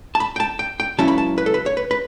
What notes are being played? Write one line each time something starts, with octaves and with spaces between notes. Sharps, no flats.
A5
B5
G5
A5
G5
G5
C#2 C#3 F#3 C#4 E4 A5
B5
A5
B4
A4
B4
C#5
B4
B4